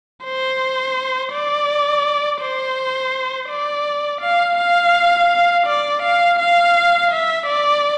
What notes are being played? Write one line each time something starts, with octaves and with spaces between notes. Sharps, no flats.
C5
D5
C5
D5
F5
F5
D5
F5
F5
E5
D5